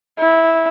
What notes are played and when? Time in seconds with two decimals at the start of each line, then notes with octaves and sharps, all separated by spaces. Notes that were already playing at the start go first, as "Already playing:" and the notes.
0.19 E4